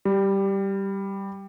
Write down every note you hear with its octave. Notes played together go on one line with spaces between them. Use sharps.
G3